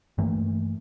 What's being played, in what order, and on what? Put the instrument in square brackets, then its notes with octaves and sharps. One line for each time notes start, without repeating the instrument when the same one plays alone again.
[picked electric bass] G2 E3 A3 A#3